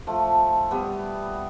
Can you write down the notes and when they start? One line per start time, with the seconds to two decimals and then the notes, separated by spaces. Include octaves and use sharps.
0.07 F3 A3
0.71 G3 B3